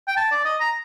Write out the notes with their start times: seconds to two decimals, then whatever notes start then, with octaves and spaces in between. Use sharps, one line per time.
0.08 G5
0.17 A5
0.31 D5
0.45 D#5
0.60 A#5